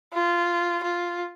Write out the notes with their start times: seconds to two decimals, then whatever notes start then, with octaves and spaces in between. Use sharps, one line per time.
0.13 F4
0.83 F4